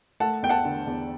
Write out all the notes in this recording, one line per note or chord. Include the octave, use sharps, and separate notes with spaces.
A3 F#5 A5
E2 G5
F#5 A5
D3
E2